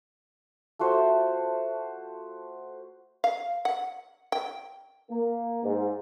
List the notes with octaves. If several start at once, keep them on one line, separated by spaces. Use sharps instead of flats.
A3 F4 F#4 C5
F5
F#5
G5
A#3
G#2